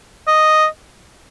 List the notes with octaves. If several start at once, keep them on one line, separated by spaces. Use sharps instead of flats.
D#5